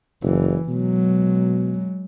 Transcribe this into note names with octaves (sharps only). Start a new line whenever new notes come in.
F#1 E3
B2 F#3 G#3